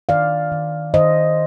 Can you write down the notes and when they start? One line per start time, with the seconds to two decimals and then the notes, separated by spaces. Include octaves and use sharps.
0.09 D#3 D5 F5
0.52 D#3
0.94 D#3 C5 D#5